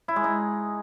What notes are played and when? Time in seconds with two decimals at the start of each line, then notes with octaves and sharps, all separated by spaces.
0.08 E4
0.16 G#3
0.24 D#4